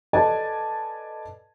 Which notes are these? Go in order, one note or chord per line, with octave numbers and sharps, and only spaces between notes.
A4 B4 D5 D#5 G#5 A5